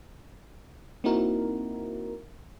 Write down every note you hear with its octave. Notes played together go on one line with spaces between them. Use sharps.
A#3 C4 D#4 E4 F#4 A#4